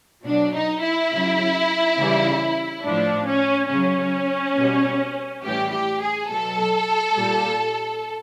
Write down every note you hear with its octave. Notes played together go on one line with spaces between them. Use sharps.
B2 F#3 D4
D#4
E4
C#3 F#3
C#3 E3 G3
A2 F3 D4
C#4
C#3 F#3 C#4
B2 G3
A2 E3 G3 G4
G4
G#4
B2 F#3 A4
A#2 G3